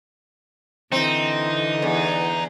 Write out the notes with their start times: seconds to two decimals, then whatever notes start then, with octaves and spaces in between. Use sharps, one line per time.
0.92 D3 E3 C4 D#4
1.82 E2